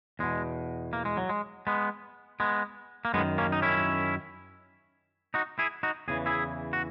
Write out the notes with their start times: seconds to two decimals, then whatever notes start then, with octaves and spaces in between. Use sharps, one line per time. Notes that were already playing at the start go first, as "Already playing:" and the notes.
0.19 E2 B2 G#3
0.93 A#3
1.05 G#3
1.17 F#3
1.29 G#3
1.67 G#3 B3
2.40 G#3 B3
3.05 A#3
3.14 F#2 G#3 B3
3.18 D#3
3.38 A#3 C#4
3.52 D#4
3.62 C#4 E4
5.34 D#4 F#4
5.59 E4 G#4
5.83 D#4 F#4
6.08 E2 C#3 E3 G#4
6.26 E4 G#4
6.73 F#4